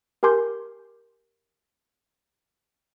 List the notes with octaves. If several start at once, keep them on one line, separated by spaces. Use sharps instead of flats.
G4 A#4 G#5 C6 D6 G6